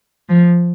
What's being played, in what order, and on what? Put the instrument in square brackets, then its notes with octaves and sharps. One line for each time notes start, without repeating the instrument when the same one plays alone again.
[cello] F3